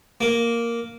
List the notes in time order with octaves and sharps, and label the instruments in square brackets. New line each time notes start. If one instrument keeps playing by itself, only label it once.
[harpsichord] A#3